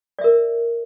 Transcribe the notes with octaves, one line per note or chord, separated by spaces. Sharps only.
A#4 D5 E5